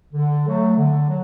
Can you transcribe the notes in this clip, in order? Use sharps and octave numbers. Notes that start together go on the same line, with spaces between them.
D3
F#3 A3
D3
F#3